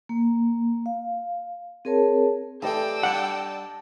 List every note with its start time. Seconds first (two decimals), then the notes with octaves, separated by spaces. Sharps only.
0.09 A#3
0.86 F5
1.85 C4 G#4 A#4 C#5 A5
2.62 E3 A3 G4 D5 D#5 G5 A5 E6
3.03 G3 D4 F#5